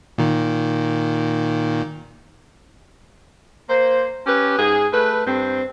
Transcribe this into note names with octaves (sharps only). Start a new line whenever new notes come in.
A#2 D#3
A#3 C5
C#4 G4 B4
G#2 G#4
A3 B4
G2 C4